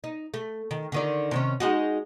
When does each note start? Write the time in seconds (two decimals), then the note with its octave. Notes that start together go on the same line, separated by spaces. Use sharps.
0.04 D#4
0.34 A3
0.71 D#3
0.92 D3 D#3 D5
1.31 C3 D#3 C#4
1.60 G#3 D#4 F#4